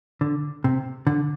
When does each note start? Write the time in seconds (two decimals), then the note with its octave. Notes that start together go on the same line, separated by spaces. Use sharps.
0.21 D3
0.64 C3
1.07 D3